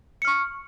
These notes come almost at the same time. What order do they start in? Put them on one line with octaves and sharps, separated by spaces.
C#7 F6 C#6